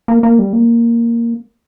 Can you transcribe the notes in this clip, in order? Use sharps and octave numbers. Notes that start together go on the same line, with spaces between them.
A#3
A#3
G3
A#3